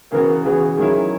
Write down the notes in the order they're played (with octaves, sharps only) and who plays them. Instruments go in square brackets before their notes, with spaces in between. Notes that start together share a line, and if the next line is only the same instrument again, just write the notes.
[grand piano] C#3 E3 B3 F#4 [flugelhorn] A#4
[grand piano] C#3 E3 B3 F#4 [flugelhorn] G#4
[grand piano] D#3 F#3 C#4 E4 [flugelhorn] G#4